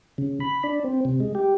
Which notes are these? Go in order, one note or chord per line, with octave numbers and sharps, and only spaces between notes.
C#3
B5
D4
C4
C3
G#3
G4